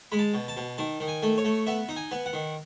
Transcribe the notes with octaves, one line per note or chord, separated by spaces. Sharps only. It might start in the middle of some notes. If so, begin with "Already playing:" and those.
G#3 B5
A5
B2
A5
B2
D#3 A5
D#3
G#5
A3
C#5
A3
B3 E5
D#4
G#5
B3
F#5
D#3